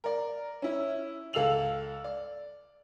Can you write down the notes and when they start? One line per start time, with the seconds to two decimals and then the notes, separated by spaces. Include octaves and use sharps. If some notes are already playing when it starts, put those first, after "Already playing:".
0.04 A#4 D5
0.62 C#4 E4
1.33 C#2 A4 F5 E6 F7 F#7
2.04 D5